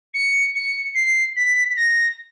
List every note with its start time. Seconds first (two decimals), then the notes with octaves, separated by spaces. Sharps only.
0.14 C#7
0.55 C#7
0.95 C7
1.36 B6
1.76 A#6